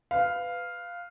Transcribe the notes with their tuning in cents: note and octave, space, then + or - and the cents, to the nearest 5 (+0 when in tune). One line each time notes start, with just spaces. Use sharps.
B4 +15 F5 +0